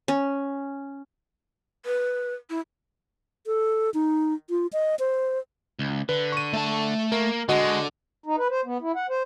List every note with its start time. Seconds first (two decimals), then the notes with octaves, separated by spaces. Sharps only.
0.08 C#4
1.86 B4
2.50 E4
3.46 A4
3.94 D#4
4.50 F4
4.73 D#5
4.99 C5
5.79 C#2
6.09 D3 B4
6.32 C#6 D#7
6.53 A3 A5
7.12 A#3 A#4
7.49 D3 G#3 F#4 D#5 F#5
8.26 D#4
8.38 B4
8.50 C5
8.65 B3
8.82 E4
8.96 F#5
9.09 C5